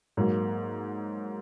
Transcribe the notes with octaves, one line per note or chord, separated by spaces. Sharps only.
G#2 F#3 A#3